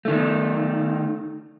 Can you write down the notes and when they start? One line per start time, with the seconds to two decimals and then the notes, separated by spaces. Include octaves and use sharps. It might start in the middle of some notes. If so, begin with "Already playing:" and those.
0.05 D#3 A3